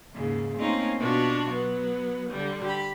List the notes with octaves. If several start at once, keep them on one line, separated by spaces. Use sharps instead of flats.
D#2 G#2 C#3
A3 A#3 C4 C#4 D#4 F4
B2 B3 D4 F4 F#4
F#3 B3
D3 G3
G4 B5